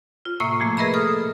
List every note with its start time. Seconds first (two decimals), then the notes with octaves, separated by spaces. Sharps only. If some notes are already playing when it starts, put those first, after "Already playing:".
0.25 F4
0.40 A2 C3 A#3 E5 C#6 E6
0.60 A#2 F3 A3 A#3
0.77 G#4 A#4 B4 D#5 E5 B5
0.94 A4 D#6 F6